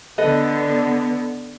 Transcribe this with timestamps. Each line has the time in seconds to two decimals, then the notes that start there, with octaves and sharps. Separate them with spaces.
0.18 D3 B3 A4 B4 D#5